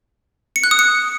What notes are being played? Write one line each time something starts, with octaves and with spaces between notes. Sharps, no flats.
C#7
F#6
D#6
C#7